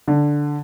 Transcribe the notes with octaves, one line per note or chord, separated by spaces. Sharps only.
D3